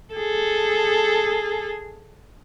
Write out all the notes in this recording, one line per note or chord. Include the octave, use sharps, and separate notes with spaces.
G#4 A4